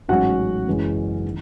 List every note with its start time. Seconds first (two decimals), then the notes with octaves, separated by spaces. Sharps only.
0.09 A1 G#2 F#3 C#4 F#4 F#5
0.67 F#1 F#2 E3 G#3 C#4
1.25 D#3